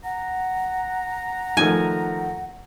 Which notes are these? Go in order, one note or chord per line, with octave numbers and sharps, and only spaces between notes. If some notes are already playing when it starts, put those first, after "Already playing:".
F#5 A#5
D#3 F3 A3 G#5